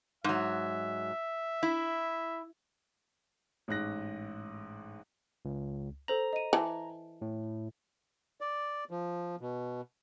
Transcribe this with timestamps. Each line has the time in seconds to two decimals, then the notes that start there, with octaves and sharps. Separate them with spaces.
0.24 G#2 F#3 E5
1.63 E4
3.68 A1 G#2 F#6 A#6
5.45 C#2
6.08 A4 C5 A#5 F#7
6.33 D#5 D#7
6.53 E3 A5
7.22 A2
8.41 D5
8.91 F3
9.41 B2